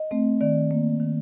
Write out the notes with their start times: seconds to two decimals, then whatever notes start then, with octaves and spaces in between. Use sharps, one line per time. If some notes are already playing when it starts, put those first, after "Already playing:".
Already playing: D#5
0.11 A3 C4
0.41 D#3 D5
0.71 A#3
1.00 D#3